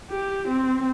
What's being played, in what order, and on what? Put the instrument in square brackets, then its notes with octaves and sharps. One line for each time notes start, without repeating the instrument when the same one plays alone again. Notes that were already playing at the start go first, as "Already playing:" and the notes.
[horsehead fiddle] G4
C4